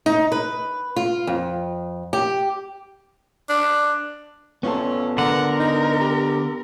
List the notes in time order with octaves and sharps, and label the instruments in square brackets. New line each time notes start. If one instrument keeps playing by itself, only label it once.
[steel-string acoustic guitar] D#4
B4
F4
F2
G4
[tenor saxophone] D4
[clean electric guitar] B3 F4 A4 [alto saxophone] C#4
[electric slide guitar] D3 [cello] A#4 [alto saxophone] F#5
[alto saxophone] D#4
G4